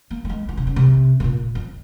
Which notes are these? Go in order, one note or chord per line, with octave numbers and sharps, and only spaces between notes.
A#3
A#3
G#3
E3
C3
C#3
C3
G#2
A#2
F2